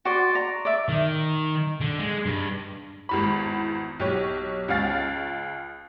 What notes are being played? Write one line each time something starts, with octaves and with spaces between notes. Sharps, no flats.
F#4 D5 C6
A#5
D5 E5
D#3
D3
G#3
G2
G#1 E2 B5
B1 G4 C#5
C#2 C#4 F5 A6